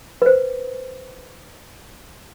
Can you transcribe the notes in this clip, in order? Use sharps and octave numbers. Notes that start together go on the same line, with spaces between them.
B4 C5